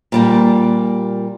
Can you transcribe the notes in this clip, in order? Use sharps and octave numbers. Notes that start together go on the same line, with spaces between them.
A#2 G3 A#3